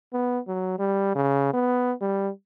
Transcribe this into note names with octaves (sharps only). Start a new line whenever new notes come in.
B3
F#3
G3
C#3
B3
G3